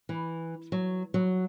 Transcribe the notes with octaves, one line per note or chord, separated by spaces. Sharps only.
E3
F#3
F#3